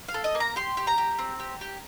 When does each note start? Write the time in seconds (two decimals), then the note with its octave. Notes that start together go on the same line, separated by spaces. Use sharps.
0.08 F5
0.14 A4
0.24 D#5
0.35 A#3
0.40 A#5
0.56 G4 C6
0.77 G4
0.87 A#5
0.98 G4
1.19 C4
1.40 G4
1.61 G4